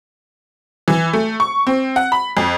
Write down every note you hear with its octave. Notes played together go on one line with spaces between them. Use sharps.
E3
A3
C#6
C4
F#5
B5
F2